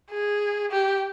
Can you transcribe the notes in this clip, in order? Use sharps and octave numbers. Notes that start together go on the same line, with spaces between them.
G#4
G4